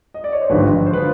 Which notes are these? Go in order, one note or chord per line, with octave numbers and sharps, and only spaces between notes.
D#5
D5
C#5
C5
G#1 G2 D3 F3 B4
C5
D3 F3 B4